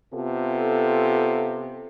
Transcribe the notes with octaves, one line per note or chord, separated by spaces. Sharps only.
C3 B3 F4 A4